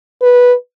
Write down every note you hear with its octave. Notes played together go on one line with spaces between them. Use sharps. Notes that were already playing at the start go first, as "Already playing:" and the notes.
B4